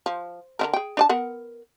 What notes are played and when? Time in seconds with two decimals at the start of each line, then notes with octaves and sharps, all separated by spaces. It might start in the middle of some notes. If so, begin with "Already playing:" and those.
0.06 F3
0.59 D3 D#3 A#4
0.73 G#4 G5
0.97 D4 D5 A5
1.09 B3 A#4 F#5